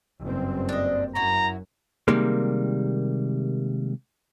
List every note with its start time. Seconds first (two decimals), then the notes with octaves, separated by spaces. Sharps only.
0.22 F#1 G2 C4
0.69 D4 D#5
1.15 F#2 E4 F#4 A#5
2.08 C3 D#3 G3 G#3 A#3